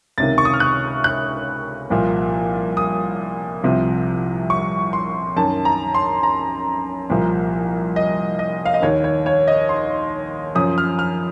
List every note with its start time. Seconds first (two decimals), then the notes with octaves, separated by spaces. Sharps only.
0.18 C#2 C3 D#3 A6
0.38 C#6
0.45 D#6
0.54 F6
0.60 F#6
1.04 F#6
1.90 C2 A#2 F3
2.77 D#6
3.64 C2 C3 F3
4.50 C#6
4.93 C6
5.37 F#2 D#3 A5
5.65 A#5
5.94 C6
6.23 A#5
7.10 C2 A#2 F3
7.96 D#5
8.39 D#5
8.65 F5
8.74 D#5
8.82 D#2 D#3 C#5
9.04 C#5
9.26 C#5
9.48 D#5
9.69 C6
10.55 F#2 F3 D#6
10.78 F6
10.99 F6